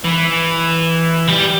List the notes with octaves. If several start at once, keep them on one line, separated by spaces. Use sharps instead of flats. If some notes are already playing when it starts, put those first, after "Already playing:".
E3
G3